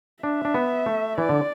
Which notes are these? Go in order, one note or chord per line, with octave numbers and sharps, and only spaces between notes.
D4 E5
D4
B3
A3
E3 D5
D3